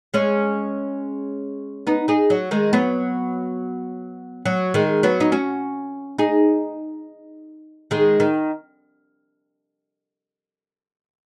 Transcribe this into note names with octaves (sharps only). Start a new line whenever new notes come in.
G#3 C#4
B3 D#4
D#4 G#4
F#3
D#3 G#3
F#3 B3
F#3
D#3 G#3
F#3 B3
D#4
C#4 F#4
D#4 G#4
D#3 G#3
D#3